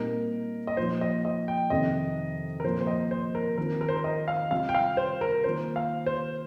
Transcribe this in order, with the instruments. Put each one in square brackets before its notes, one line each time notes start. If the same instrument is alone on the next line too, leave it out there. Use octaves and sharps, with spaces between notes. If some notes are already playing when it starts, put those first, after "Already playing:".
Already playing: [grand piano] A#2 G3 C4 D#4 [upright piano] A#4
[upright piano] D#5
[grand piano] A#2 F3 D#4 [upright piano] C5
[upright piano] D#5
D#5
G5
[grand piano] F2 C3 D#3 [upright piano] D#5
[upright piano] A#4
[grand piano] A#2 F3 A#3 [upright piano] C5
[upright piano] C5
D#5
C5
A#4
[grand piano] D#3 C4 F4 [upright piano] A#4
[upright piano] A#4
C5
A#4
D#5
F5
[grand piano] C3 G3 C4 F4 [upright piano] F5
[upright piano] G5
F5
C5
A#4
[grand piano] D#3 A#3 F4 [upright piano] C5
[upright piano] F5
C5